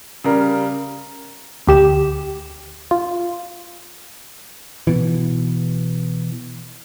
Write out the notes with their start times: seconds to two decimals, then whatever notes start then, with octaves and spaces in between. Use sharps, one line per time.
0.24 C#3 G3 A#4
1.67 D2 G4 E7
2.91 F4
4.87 B2 E3